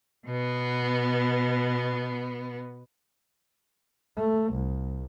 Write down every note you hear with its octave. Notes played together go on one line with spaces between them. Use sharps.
B2 B3
A3
C2